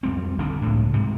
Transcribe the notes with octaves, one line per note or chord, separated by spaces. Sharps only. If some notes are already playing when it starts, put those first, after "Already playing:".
F2 G3 C4
G1 F2 A#2 D4
C#2 A2
G#2 C3 G3